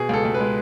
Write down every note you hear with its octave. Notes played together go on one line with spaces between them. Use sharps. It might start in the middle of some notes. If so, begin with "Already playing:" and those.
Already playing: B2 G#4
C#2 A4
C#2
B4
G#3